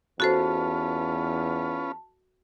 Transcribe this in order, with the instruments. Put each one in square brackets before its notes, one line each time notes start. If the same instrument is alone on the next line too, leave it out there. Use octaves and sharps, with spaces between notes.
[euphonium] E2 [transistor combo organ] C#4 F4 B4 [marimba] F#4 A4 C5 [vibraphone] A5